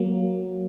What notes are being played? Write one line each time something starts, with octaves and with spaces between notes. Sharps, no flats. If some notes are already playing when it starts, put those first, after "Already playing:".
Already playing: F#3 A#3